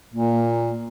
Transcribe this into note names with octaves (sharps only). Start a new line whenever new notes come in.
A#2 A#3